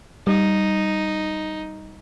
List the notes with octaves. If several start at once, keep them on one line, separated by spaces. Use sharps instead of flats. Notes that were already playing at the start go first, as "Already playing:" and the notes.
G3 D#4